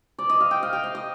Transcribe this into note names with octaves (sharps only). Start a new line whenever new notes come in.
D5
D#5
F5
G5
F5
G5
F5
D#5